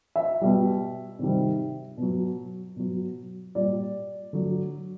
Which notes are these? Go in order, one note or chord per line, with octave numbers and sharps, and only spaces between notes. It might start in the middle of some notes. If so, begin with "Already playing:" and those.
E5
B2 G3
C3 D#3 G3
B2 F#3
B2 F#3
A#2 G3 D5
D3 F#3